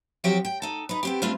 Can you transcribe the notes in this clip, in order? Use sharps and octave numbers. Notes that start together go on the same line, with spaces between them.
F3 F#3 C4 F#4 G4 G5
G5
D#4 A4
D#4 B4
B3 C4 G4
G3 A3 C4 D4 F4 B4